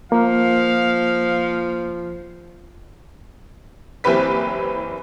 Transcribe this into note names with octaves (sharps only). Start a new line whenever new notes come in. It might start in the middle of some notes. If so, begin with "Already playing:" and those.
F3 A#3 F5
F#1 E3 C4 G4 B4 B6